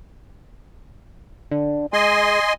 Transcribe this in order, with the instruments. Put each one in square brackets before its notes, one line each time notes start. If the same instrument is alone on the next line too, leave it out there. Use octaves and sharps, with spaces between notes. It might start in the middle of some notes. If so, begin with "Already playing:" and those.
[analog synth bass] D3
[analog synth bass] G#3 [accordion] D#5 G#5 C6